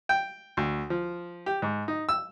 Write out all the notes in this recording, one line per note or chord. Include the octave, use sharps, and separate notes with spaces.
G5
D2
F3
G4
G#2
D#4
E6